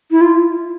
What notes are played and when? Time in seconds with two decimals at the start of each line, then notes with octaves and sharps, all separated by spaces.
0.11 E4
0.21 F4